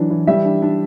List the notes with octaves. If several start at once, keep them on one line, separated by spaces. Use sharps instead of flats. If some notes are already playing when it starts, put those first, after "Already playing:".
Already playing: E3 F#3 D4
E3
G3 E5
D4
D4